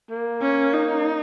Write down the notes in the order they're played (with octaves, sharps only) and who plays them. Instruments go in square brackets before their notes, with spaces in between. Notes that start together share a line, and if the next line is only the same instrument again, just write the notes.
[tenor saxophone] A#3
[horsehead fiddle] C#4
D#4